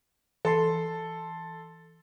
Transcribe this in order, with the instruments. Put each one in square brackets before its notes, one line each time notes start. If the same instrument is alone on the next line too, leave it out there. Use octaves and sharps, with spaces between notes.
[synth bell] E3 C6 C7 [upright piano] A4